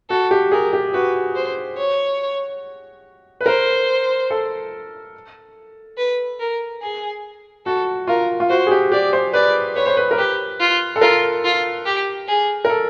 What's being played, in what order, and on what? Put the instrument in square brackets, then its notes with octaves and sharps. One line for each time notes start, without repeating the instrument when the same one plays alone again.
[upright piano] F#4 [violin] A4
[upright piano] G4
[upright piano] G#4 [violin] A#4
[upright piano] G4
[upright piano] F#4 [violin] B4
[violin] C5
C#5
[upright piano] B4
[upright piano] A#4 [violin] C5
[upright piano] A4
[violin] B4
A#4
G#4
[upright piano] F#4 [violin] A4
[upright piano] F4 [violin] A#4
[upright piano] F4
[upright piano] F#4 [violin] C5
[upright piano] G#4
G4
[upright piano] G4 [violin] D5
[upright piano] C5
[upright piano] B4 [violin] D5
[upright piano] B4 [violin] C#5
[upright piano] C5
B4
A#4
[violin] G4 [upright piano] B4
[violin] F4
[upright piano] A4
[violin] F4 [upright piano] A#4
[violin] F4
G4
G#4
[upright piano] A#4
A4